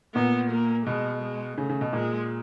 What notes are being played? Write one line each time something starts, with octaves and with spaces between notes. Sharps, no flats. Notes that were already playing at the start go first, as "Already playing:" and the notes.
A#2 B3
A#3
B2 G#3
G#3
C#3 A3
C#3
B2
A#2 G#3